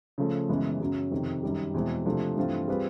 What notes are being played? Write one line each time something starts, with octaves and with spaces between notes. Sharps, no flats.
C#3 F3 A3
F#2 C#3 E3 G#3 B3
F#2 C#3 F#3
F2 C3 D#3
F#2 D#3 G3
E2 B2 G#3 C4 E4
C3 F3 A3 D4
G2 E3 A3 C4 F4
G3 C4 F4 G#4 B4